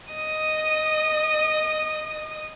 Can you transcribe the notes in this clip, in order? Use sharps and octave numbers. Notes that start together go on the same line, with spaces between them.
D#5 D#6